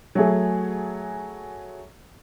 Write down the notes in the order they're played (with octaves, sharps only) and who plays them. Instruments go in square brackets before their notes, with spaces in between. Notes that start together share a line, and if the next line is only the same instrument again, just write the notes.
[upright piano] F#3 A3 G#4